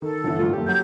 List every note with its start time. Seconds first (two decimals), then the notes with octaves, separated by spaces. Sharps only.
0.02 D#3 A4
0.24 G1 D3 E3
0.39 G#1 A3 F4
0.53 F#1 G4 A4
0.68 F#3 G6